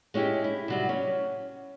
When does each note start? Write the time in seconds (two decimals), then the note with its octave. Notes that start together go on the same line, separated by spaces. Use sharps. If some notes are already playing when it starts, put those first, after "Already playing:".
0.14 G#3 C#4 E4 G4
0.44 E4
0.68 C3 F#3 G3
0.89 C#4